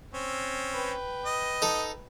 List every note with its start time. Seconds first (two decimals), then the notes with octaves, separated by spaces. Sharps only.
0.14 C4 C#4
0.73 B4 G5
1.26 D#5
1.62 D#4 A4